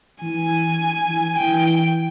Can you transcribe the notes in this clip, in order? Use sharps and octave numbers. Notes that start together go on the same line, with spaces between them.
E3 G#5
E3
E3 G5